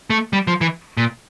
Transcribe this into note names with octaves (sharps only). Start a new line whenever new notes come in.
A3
G3
F3
E3
A#2